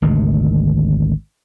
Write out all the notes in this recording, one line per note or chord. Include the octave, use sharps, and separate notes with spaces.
G#1 D2 C3 D#3